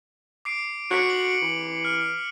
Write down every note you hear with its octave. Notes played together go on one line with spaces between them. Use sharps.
D6 C7 D7
F#4 B6 C#7 D7
F#7
E3
F6